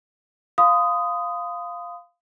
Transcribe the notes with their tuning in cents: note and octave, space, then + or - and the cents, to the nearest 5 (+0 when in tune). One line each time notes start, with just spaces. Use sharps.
F5 +0 C6 -45 D#6 +0